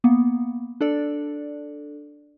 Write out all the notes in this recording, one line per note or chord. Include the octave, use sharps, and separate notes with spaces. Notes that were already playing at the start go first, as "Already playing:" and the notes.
A#3 B3
D4 A4 D5